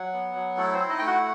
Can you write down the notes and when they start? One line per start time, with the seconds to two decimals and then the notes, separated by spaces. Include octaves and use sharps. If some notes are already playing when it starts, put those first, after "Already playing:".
Already playing: F#3 F#5
0.13 B3
0.35 F#3
0.57 A3 E4 A4
0.74 C4 C5
0.79 E4
0.90 D#4 D#5
0.99 A3 G5
1.07 F#4 F#5